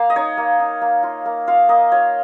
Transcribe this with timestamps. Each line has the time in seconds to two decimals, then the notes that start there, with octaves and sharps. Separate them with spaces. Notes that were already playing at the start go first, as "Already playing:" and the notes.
Already playing: A#3 F5
0.10 D#5
0.16 D#4 C#5
0.37 A#3
0.60 D#4
0.81 A#3
1.03 F4
1.26 A#3
1.47 F4 F5
1.69 A#3 D#5
1.92 F4 C#5